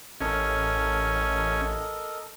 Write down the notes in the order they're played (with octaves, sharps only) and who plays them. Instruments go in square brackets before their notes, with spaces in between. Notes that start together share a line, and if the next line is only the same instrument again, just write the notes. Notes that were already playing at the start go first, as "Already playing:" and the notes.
[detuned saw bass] A1 [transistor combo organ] C#4 [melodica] A4 A#4 D#5